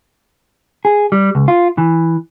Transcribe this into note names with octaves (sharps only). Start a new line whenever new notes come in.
G#4
G3
C#2
F4
E3